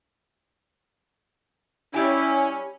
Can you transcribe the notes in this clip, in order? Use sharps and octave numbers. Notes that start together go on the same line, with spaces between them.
G3 C#4 E4 G4 G#5